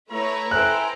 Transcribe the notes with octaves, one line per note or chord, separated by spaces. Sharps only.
A3 E4 B4 C#5 A#5
A4 B4 C5 E5 G5 G#5 F#6